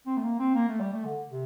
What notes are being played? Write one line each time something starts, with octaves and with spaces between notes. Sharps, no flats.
C4
A3
A#3
C4
A#3
A3
G3
A3
D3
C3